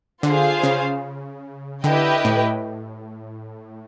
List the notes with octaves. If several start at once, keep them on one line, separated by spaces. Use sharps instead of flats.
D3 F4 G#4 C5 F5
C#3
D3 E4 G4 B4 D#5 G5
A2